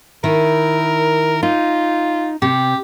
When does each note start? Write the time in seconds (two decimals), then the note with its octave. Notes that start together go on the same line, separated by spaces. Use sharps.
0.24 D#3 E4 A#4
1.43 D#4 F4
2.42 C3 G4